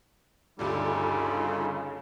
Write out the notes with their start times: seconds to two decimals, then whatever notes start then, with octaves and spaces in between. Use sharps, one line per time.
0.59 G1 D2 G2 C#3 G3 D#4 F4 A4